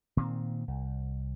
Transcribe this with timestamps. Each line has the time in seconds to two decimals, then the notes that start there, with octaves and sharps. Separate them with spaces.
0.17 A#2 D#3 C4
0.68 C2